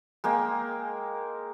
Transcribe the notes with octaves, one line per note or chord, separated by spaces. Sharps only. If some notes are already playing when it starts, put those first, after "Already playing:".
G#3 A#3 G5